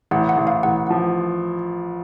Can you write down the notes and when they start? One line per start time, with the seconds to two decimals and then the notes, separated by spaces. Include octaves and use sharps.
0.11 A1 F#5
0.29 F#5
0.37 A1
0.47 F5
0.63 A1 F#5
0.87 F3 F#5